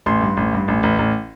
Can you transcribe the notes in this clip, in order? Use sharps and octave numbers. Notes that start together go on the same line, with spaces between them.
A1 C6
G2
A1
G2
A1
A1
A1